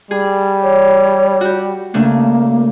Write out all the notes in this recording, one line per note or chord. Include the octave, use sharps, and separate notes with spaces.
G3 G#4
C#5
F#4 G4
C#3 A3 A#3 D4